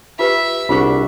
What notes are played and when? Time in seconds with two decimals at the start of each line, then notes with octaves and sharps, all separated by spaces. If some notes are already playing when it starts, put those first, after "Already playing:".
0.19 F4 G4 B4 E5
0.69 C2 D4 F4 G#4 F5 F#5 C#6